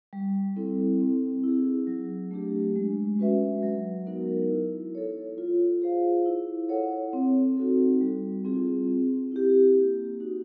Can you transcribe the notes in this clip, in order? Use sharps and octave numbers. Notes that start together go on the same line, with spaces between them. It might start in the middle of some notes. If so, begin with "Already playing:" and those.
G3
C4 E4 A4
C4
E4 G#4
F#3
A3 D4 G4
G#3
C#4 F#4 B4 E5
F#3
B3 D#4 F#4 A#4
E4
A4 C#5
F4
G#4 C5 F5
E4
A4 C#5 F#5
C4
D#4 F#4 A4
G3
C4 F4 G#4
C4
E4 G4
A#3
D#4 F#4